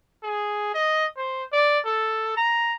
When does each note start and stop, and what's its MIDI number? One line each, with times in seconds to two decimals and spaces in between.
0.23 0.70 68
0.74 1.05 75
1.17 1.44 72
1.52 1.79 74
1.85 2.36 69
2.37 2.76 82